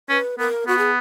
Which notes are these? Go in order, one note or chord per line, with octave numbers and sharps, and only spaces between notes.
C#4 B4
B3 A#4
B3 F#4
G#4